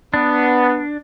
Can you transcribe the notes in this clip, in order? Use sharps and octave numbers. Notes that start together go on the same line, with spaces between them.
B3 D4